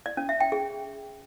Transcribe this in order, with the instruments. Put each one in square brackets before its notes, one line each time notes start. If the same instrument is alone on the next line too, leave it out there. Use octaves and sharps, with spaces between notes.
[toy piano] D5
C#4
E5
G5
G#4